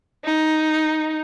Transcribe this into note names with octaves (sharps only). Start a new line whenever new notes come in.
D#4